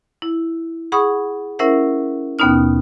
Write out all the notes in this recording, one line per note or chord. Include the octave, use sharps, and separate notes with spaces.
E4
G#4 F#5 B5 C#6 D#6
C#4 E4 A#4 C5 E5 F#5
D#2 B2 B3 C#4 D#4 F6